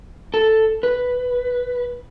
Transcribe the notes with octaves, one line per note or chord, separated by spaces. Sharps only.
A4
B4